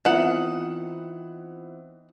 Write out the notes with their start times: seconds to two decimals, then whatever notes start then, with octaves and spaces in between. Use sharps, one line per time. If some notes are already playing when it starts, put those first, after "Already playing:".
0.05 D#3 E3 B3 C4 F4 E5 F#5